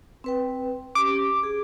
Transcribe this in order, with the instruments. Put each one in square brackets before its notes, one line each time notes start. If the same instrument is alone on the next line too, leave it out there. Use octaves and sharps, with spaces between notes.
[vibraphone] C4 B4 G5
[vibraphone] C#4 G4 [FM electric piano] D6
[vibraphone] G#4